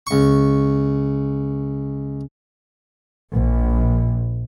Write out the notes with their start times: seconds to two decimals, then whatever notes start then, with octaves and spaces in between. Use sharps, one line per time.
0.07 C#2 C#6
3.34 A#1